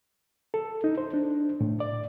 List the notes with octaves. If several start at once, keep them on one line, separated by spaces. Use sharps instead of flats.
A4
D#4
C5
D4
A2
D5